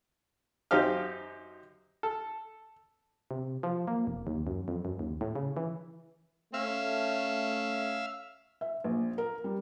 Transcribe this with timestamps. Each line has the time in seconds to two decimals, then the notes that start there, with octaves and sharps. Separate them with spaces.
0.71 F#2 C4 D#4 G4 F5 F6
2.03 A4
3.31 C3
3.63 F3
3.88 A#3
4.07 F1
4.27 D#2
4.47 F#2
4.68 F2
4.85 F#2
4.99 D#2
5.21 A2
5.36 C#3
5.57 E3
6.54 A3 C#4 E5 F5
8.61 E5
8.84 A#1
9.18 A#4
9.44 G3